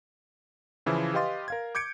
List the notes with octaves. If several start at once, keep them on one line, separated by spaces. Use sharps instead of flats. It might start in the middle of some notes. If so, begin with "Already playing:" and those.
C#3 E3 F3 E4 C5
G4 B4 D#5 F5 C6 A6
A#4 F5 G#6
D6 G6 G#6 C#7 D7